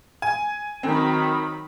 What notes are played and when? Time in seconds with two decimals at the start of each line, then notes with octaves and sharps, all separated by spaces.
0.22 G#5
0.83 D#3 F#3 C4 B5